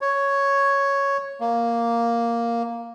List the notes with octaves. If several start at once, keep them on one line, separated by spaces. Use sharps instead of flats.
C#5
A#3